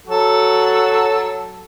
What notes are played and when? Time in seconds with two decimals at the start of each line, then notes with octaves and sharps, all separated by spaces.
0.07 F#3 F#4 A4